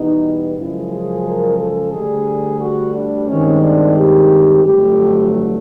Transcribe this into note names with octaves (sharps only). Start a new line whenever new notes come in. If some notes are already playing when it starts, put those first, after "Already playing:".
Already playing: E2 B2 G3 B3 D#4
F#2 C#3 F3 G#3 E4
G#4
A#4
A4
D2 D3 G3 G#4
F#4
D4
G2 D#3 G#3 C4 C#4
D4
G4
G1 F2 D3 F#3 A3 G4